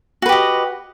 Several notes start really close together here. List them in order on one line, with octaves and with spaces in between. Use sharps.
F#4 B4 G4 D#5